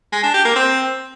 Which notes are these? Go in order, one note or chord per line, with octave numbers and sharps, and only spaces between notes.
G#3
D4
G4
A#3
C4